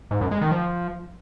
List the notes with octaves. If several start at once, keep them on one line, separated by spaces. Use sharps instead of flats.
G#2
F#2
G#3
D#3
F3